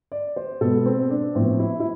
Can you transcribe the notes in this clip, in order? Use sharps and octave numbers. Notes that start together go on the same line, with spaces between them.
D5
C5
B2 G#3 B3 A4
C4
D4
A2 F3 B3 C4
E4
E4